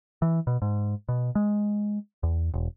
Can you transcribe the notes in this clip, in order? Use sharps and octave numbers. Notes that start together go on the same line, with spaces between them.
E3
B2
G#2
B2
G#3
E2
E1